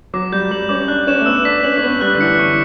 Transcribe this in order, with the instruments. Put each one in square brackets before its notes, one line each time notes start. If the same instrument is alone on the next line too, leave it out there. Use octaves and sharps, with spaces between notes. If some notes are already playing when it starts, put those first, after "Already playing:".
[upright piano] F#3 [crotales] D6
[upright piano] G3 [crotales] G6
[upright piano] G3 [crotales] F#7
[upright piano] C#4 [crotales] D6
[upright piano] D4 [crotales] F#6
[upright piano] C#4 [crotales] E7
[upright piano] A3
[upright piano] B3 [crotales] E6
[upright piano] D4 [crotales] B6
[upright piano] C#4 [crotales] F#7
[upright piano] C#4
[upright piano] B3 [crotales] C#6
[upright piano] G3 [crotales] F#6
[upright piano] D3
[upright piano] E3 [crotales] C#7
[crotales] C#6